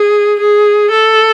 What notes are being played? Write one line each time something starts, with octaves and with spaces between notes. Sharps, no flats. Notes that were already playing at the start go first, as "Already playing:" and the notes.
Already playing: G#4
G#4
A4